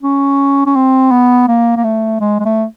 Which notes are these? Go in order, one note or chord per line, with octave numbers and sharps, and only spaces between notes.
C#4
C#4
C4
B3
A#3
A#3
A3
G#3
G#3
A3